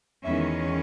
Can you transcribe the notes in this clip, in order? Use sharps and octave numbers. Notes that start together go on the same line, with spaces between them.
E2 D#3 G#3 C#4 E5